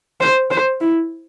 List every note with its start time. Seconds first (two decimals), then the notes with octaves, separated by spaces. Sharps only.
0.21 C5
0.50 C5
0.80 E4